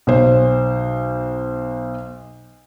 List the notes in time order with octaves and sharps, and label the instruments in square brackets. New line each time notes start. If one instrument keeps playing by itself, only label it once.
[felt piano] B1 C5